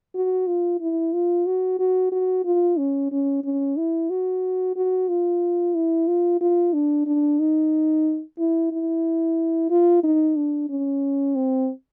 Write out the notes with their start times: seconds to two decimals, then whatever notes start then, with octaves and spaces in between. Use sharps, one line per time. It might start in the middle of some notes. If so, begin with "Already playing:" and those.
0.15 F#4
0.47 F4
0.81 E4
1.13 F4
1.47 F#4
1.79 F#4
2.12 F#4
2.45 F4
2.78 C#4
3.12 C#4
3.44 C#4
3.77 E4
4.10 F#4
4.76 F#4
5.09 F4
5.75 E4
6.08 F4
6.41 F4
6.73 D4
7.07 D4
7.39 D#4
8.39 E4
8.72 E4
9.70 F4
10.04 D#4
10.36 D4
10.69 C#4
11.35 C4